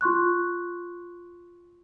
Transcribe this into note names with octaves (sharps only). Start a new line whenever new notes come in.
F4 C6 C#6 F#6